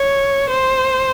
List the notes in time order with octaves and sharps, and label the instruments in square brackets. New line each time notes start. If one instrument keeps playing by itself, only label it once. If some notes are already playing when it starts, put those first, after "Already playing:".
Already playing: [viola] C#5
C5